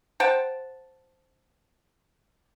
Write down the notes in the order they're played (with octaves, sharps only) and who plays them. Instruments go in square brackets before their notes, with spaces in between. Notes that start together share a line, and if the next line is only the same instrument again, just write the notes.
[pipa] C5 F#5 G5 A5